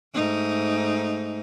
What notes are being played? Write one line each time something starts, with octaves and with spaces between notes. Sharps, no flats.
G#2 A3 D#4